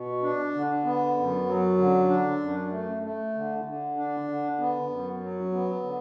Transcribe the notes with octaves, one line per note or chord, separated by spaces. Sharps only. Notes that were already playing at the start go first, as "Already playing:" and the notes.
Already playing: B2
D4
D3
B3
F#2
F#3
D3
D4
F#2
A3
A3
D3
D3
D4
D3
B3
F#2
F#3
B3
D3